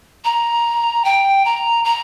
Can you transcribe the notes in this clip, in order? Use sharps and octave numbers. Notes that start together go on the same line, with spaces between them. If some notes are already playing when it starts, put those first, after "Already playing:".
A#5
G5
A#5
A#5